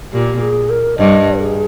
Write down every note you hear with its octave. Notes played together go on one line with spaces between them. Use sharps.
A#2 G4
G#4
A#4
G2 D#5
G#4